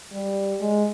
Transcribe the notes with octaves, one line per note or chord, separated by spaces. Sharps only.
G3
G#3